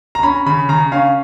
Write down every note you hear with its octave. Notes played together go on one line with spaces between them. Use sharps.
A#5
C#4 B5
C#3 B5
C#3 A#5
C#4 F5